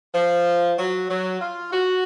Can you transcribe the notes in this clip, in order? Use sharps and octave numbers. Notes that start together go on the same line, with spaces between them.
F3
F#3
F#3
F4
F#4